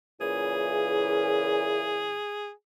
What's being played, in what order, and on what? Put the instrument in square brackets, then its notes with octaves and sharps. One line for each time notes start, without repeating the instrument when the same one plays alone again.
[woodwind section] A#2 C#3 E3 [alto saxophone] G#4